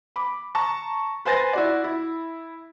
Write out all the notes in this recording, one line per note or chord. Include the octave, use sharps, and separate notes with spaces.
B5 D6
A5 A#5 C#6
B4 C5 G#5 A6 A#6
E4 F#4 D5
E4